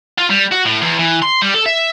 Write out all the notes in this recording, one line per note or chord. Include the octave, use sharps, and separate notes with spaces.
F4
G3
F#4
A2
E2
E3
C6
G3
A4
E5